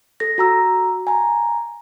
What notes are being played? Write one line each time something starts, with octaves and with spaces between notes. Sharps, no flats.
A4 A#6
F#4 A#5 E6
G#5 A#5